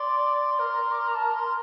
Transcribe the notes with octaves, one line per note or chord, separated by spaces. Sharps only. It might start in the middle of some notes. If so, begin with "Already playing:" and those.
Already playing: D5 C6
A#4
D6
C6
A#5
A5
C6